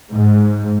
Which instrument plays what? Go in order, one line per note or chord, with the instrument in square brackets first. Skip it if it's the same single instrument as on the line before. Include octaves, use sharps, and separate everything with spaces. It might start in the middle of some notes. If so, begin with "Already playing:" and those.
[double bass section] G#2